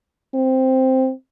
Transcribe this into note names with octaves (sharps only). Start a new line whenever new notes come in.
C4